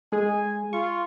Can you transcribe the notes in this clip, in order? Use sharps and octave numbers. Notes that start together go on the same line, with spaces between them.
G#3 G#4 G#5
F4 C#6